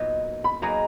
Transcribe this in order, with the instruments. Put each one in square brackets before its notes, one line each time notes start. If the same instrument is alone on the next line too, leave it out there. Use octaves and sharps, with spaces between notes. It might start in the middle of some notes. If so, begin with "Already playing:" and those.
Already playing: [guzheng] A#2 F#3 B3 D#4
[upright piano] B5
[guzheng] F#3 A#3 D#4 G#4 B4 [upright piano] A#5